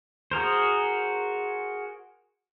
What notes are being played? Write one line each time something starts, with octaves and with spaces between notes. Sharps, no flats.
F#4 G#4 A#4 C5